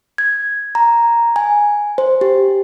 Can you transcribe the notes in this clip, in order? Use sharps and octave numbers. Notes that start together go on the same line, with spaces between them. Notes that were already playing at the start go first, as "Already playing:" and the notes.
G#6
A#5
G#5
C5
G4